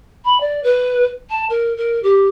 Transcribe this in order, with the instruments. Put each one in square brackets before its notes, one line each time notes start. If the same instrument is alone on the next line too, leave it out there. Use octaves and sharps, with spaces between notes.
[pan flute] B5
D5
B4
A5
A#4
A#4
G4